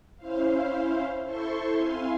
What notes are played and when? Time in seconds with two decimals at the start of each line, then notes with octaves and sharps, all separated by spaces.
0.17 C#4 E4 C5 F5
1.23 E4 A4 C5 C6 C#6
1.74 C4 E4 F5 G#5 C6